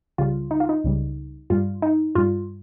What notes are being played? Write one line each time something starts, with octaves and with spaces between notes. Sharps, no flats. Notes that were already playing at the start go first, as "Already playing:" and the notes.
C#2 C#3 G3 F4
D#4
F4
D#4
C#2 C#3 G3
G2 G3 F4
D#4
G2 G3 F4